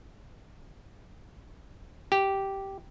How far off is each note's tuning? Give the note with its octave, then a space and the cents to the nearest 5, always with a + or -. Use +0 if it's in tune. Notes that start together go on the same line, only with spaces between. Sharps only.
G4 -10